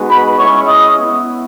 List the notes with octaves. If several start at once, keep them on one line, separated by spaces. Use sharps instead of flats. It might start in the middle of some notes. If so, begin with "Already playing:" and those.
Already playing: G#3 B3 D#4 F#4
B4 B5
G#3 C#4 E4 C#5 C#6
D#5 D#6
B3 E4